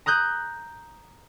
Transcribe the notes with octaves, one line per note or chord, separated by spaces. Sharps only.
A#5 D#6 F#6 G6